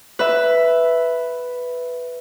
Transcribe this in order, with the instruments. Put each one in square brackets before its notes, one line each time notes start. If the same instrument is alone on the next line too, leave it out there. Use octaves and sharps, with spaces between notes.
[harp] B4 E5